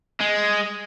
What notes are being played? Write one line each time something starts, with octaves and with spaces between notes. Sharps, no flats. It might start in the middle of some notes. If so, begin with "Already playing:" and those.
G#3